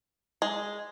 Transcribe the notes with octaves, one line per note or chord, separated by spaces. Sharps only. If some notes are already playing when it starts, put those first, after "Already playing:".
G#3